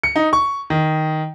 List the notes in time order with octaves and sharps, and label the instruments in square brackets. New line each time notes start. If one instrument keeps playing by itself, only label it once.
[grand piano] C#7
D#4
C#6
D#3